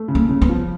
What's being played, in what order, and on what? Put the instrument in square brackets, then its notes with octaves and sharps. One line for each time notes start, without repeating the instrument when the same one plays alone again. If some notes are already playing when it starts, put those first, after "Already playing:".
Already playing: [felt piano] A3
C#3
[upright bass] A#3
[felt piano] C#3
[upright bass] B3
[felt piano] F3